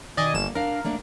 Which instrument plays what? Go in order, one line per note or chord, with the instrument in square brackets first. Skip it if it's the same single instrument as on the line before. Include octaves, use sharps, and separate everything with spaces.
[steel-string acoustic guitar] B2 D#3 [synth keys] D5 D#5 G#5
[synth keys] G1 E7 [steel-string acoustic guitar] A#3
[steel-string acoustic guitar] D4 F5 [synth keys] A#4
[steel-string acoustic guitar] A3 A#3 D4